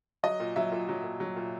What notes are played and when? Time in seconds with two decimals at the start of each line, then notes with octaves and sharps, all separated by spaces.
0.23 F#3 D#5
0.40 A#2
0.56 F#3 E5
0.72 A#2
0.89 F#3
1.04 A#2
1.20 F#3
1.36 A#2